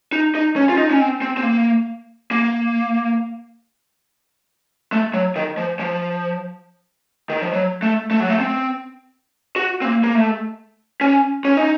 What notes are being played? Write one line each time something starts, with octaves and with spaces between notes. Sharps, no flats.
D#4
D#4
C#4
F4
D#4
C#4
C4
C4
C4
A#3
A#3
A3
F#3
D#3
F3
F3
D#3
F3
F#3
A3
A3
F#3
A3
C4
F#4
C4
A#3
A#3
A3
C#4
C#4
D#4